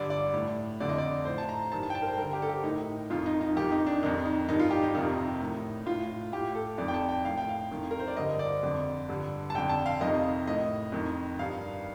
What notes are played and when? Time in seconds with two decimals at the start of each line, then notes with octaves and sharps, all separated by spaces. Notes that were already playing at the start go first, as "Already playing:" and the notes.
Already playing: G2 D3 D5
0.10 D5
0.33 A2
0.80 F2 D3 D5
0.89 D#5
0.98 D5
1.25 A2 C5
1.38 A5
1.49 A#5
1.72 G2 D#3 A5
1.83 A5
1.90 G5
1.95 A5
2.02 A#4
2.07 C5
2.17 G2 D3 A#4
2.33 G4
2.42 A4
2.49 G4
2.63 A2 D#4
3.10 F2 D#3 F4
3.26 D#4
3.41 D#4
3.56 F2 D#3 G4
3.72 D#4
3.87 D4
4.03 F2 D#3 D#4
4.25 D#4
4.49 G2 D#3 D#4
4.59 F4
4.71 G4
4.83 D#4
4.95 F2 C3 D#3
5.40 A2
5.86 A2 F4
6.32 A2 G4
6.55 A4
6.78 F2 D#3 D5
6.88 G5
6.94 A5
7.09 G5
7.25 A2 F5
7.38 G5
7.49 F5
7.71 F2 D#3
7.91 A#4
8.00 C5
8.08 D5
8.17 G2 D3 D#5
8.39 D5
8.63 F2 D3
9.08 G2 D3
9.50 A5
9.55 F2 D3 G5
9.70 A5
9.86 F5
10.00 F2 C3 D#3 D#5
10.47 A2 D#5
10.92 F2 D#3
11.38 G2 D#3 F5